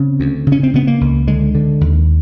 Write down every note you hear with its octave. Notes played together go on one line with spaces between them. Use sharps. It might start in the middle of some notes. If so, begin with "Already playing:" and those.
Already playing: C#3 C4
D2
C#3
C#4
C4
C#3 B3
A#3
C#2
D3 G#3
D3
D#2